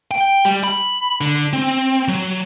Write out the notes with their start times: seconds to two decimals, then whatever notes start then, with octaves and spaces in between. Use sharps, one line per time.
0.11 G5
0.45 G3
0.64 B5
1.21 D3
1.53 C4
2.08 F#3